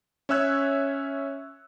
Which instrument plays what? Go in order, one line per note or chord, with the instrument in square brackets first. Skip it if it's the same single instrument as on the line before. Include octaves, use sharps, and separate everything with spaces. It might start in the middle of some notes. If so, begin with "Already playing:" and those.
[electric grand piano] C#4 C#5 E5 E6 F#6 G#6